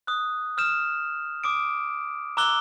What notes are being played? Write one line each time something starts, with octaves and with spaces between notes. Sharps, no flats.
D#6 F#6
D#6 F6 G6 E7
D6 D#6 D7
A#5 D6 E6 F#6 G7